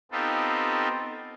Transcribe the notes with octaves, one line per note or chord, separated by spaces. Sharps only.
B3 C4 D#4 F4 G4 A4